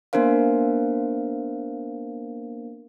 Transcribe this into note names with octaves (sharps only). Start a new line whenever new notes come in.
A#3 B3 D4 A#4 C5 F5